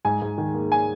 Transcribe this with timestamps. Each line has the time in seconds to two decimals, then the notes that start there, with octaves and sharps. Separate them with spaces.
0.05 G#2 G#5
0.22 G#2
0.38 D#3
0.54 A#3
0.72 G#5